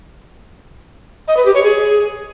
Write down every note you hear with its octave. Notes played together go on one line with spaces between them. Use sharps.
D#5
B4
G4
C#5
G#4